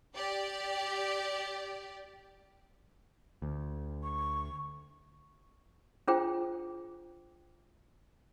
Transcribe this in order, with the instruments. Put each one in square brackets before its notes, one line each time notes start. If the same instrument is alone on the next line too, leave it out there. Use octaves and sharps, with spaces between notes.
[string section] G4 D5
[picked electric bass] D2
[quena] C#6
[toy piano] D4 F4 G#4 C5 G5